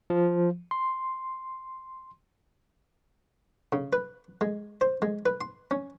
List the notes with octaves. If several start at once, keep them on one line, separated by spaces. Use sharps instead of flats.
F3
C6
C#3
B4
G#3
C5
G#3
B4
C6
C#4